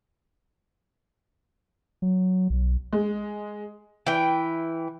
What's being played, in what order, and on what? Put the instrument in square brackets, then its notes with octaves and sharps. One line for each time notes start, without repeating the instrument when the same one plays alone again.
[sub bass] F#3
B1
[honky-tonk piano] G#3
[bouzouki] E3 G5